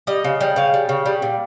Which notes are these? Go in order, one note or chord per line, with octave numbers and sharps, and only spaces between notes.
G3 D#5
C#3
G3
C#3 F5
G3
C#3
G3
A#2